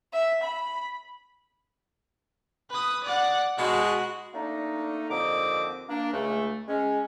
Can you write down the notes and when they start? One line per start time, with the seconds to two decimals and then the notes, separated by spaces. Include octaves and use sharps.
0.13 E5
0.44 B5
2.70 B4 D#6
3.04 D5 F#5
3.58 B2 G#3 F#4
4.34 A3 A#3 D4 D#4
5.10 D#2 D3 F3 C4 D#5 D6
5.89 A#3 D4
6.12 C#2 A3
6.68 G#3 C#4